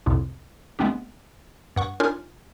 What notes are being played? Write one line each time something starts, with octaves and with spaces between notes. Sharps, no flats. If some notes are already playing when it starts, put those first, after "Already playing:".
C2 F2 A2 C3
G#3 A3 B3 C4 D4 G4
G2 F#5 C#6
D4 D#4 F4 A#4 C#5 G#5